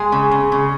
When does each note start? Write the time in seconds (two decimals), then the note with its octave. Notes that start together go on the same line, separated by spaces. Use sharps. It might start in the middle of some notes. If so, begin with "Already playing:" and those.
Already playing: G#3 G#4
0.12 C#3
0.31 C#3
0.52 C#3